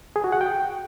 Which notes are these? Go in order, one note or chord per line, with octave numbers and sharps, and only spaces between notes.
G#4
F#4
F#5
G5